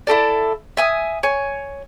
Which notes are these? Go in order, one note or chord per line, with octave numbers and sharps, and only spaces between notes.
E4 G4 A4 D5
E5 G#5 D#6
C#5 G#5